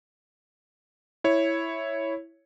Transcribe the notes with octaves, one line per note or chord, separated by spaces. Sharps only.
E4 C#5